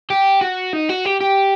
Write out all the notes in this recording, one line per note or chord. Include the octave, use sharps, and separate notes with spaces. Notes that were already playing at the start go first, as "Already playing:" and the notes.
G4
F#4
D#4
F#4
G4
G4